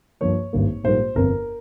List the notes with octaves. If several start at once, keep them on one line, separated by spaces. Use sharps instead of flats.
G2 F3 A#3 C#5
G#1 G2 G3 A#3
A#1 G#2 G3 A#3 C5
G1 F2 C3 A#4